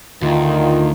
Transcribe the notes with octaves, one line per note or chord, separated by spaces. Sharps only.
D2 D#3 F4